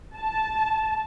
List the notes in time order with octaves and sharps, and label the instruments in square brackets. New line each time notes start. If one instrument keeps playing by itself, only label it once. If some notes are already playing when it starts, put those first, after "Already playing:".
[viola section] A5